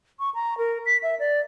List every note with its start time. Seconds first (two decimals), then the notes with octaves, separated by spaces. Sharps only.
0.19 C#6
0.35 A#5
0.58 A#4
0.86 B6
1.03 E5
1.19 D5